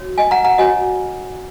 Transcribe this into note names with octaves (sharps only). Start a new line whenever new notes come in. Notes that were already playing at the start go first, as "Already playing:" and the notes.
Already playing: F#4 C#5
D#5 G#5
F#5 A#5
F#5 A#5
F#4 C#5 D#5 G#5